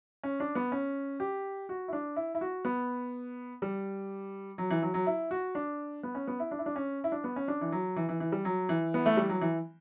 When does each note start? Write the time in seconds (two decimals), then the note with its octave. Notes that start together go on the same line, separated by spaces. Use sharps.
0.23 C#4
0.40 D4
0.55 B3
0.72 C#4
1.20 G4
1.69 F#4
1.88 E4
1.93 D4
2.16 E4
2.35 E4
2.41 F#4
2.65 B3
3.62 G3
4.58 F#3
4.70 E3
4.82 F#3
4.94 F#3
5.07 E4
5.31 F#4
5.55 D4
6.03 B3
6.15 C#4
6.27 B3
6.40 E4
6.51 D4
6.59 E4
6.66 D4
6.76 C#4
7.04 E4
7.12 D4
7.24 B3
7.36 C#4
7.48 D4
7.61 E3
7.72 F#3
7.96 E3
8.09 E3
8.20 E3
8.32 G3
8.45 F#3
8.69 E3
8.94 B3
9.06 A3
9.17 G3
9.29 F#3
9.41 E3